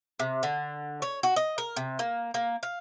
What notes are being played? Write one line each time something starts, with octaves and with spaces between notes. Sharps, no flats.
C3
D3
C#5
F#4
D#5
A#4
C3
A#3
A#3
F5